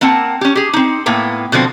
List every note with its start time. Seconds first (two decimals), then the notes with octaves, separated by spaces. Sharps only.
0.01 A#3 C4 F#5 A5
0.41 C#4 G4
0.55 G4 G#4
0.73 C4 D#4
1.06 A2 A#3 B3 G5
1.52 B2 D3 F3 C4